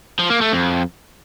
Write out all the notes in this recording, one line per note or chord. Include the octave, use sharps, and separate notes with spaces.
F3
A#3
A3
F2